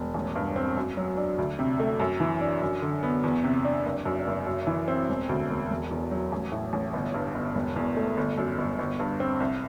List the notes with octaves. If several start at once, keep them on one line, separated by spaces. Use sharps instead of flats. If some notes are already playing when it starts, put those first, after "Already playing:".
Already playing: E1
A1
G2
C4
F#2
F#3
D4
D2
C3
A3
F#2
E3
D4
F#2
D3
B3
E2
C3
D4
F#1
F#2
F#1
F#2
E3
C4
E1
D2
E1
E1
E2
F#3
A1
A2
A1
G1
G2
G1
E1
E2
A3
G1
F#2
G1
G1
G2
C4
C2